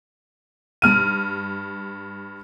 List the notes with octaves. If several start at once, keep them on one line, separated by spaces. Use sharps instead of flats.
G2 F6 D#7